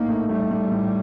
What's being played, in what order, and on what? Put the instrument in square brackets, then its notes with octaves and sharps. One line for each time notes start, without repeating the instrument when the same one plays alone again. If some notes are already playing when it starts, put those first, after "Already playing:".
Already playing: [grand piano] A#1 A2 D#4 [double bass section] A#3
[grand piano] A3
[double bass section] G3 [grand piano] A3
[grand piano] A3
A2